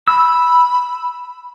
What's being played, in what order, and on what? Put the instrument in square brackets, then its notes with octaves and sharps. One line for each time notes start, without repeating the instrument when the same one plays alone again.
[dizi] B5 [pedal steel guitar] E6